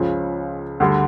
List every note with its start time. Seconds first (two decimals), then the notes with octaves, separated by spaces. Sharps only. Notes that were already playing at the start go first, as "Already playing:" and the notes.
Already playing: C#2 C#3 F3
0.80 D2 D3 G3